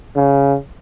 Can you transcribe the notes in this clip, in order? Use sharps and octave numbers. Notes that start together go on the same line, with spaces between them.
C#3